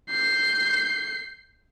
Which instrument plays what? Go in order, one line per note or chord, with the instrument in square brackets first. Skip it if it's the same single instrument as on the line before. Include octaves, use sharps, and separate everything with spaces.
[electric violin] G6 C7